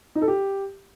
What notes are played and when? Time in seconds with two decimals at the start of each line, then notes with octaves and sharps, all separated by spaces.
0.15 D#4
0.22 A4
0.28 G4